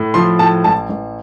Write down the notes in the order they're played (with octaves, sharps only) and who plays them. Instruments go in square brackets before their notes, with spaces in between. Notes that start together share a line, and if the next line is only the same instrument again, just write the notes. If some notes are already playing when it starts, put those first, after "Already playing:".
Already playing: [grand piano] A2
F3 C6
A2 A5
A1 A5
A1